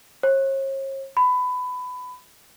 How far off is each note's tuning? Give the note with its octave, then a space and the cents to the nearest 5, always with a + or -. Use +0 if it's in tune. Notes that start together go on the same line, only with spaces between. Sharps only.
C#5 -45
B5 +20